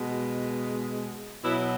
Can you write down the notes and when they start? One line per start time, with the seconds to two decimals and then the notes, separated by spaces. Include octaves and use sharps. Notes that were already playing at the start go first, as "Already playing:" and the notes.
Already playing: B2 G#3
1.43 B2 F#3 B3 E4